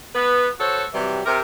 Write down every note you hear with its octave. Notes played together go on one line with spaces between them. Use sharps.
B3 B4
F#4 A4 C5 C#5
C3 E3 F#3 G3
C3 A#4